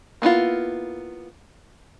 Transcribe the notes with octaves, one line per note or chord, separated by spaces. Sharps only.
A#3 B3 E4 F4